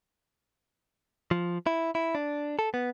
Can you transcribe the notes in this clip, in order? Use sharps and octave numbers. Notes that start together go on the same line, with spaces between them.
F3
E4
E4
D4
A4
B3